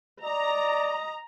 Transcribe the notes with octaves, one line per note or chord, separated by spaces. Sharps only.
D5 D#5 A#5